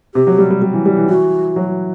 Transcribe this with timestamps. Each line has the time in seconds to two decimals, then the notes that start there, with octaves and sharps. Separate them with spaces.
0.14 C3 G4
0.27 F#3
0.38 G3
0.51 G3
0.62 G3
0.74 E3
0.86 G3
0.97 E3
1.09 E3 F#4
1.56 F#3